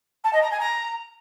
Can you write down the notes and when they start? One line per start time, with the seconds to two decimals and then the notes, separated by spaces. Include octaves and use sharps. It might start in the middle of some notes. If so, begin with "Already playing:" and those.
0.24 A5
0.33 D#5
0.42 A#5
0.51 G#5
0.60 A#5